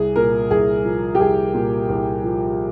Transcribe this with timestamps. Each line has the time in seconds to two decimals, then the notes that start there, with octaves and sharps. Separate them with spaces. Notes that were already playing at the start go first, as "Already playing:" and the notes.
Already playing: C2 G#4
0.16 A#2 A#4
0.50 C2 G#4
0.85 F3
1.15 G4
1.20 C2 G#4
1.54 A#2
1.89 C2
2.24 F3